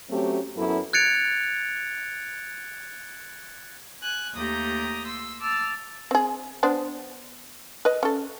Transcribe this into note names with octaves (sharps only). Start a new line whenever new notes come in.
F#3 A3 C4 C#4 G4
F#2 F#3 B3 E4 A4
F#6 G#6 A6 C#7 D7 F7
G#5 F#6
D#2 A3 G4 A#5 D#6 G6
C6 E6
A5 D6 E6 F6 A6
C4 G#4
B3 D4 C5
B4 D#5
C#4 A4